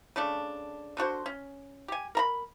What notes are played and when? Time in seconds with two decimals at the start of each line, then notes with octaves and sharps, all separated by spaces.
0.16 C#3 A3 D4
0.97 D3 D4 F#4 C5
1.26 C#4
1.88 G4 G#5
2.15 A#4 A#5 B5